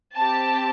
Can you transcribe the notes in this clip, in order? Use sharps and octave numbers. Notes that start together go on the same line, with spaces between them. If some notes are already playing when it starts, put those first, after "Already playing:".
C4 G4 A5